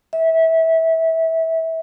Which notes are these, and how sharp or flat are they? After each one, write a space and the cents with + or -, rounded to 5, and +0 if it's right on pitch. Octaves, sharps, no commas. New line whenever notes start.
E5 -20